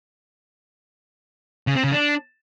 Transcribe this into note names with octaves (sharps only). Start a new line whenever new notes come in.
C#3
C4
C#3
D4